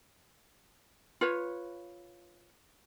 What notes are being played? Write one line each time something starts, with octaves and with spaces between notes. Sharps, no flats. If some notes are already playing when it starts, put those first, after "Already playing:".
F4 B4 C#5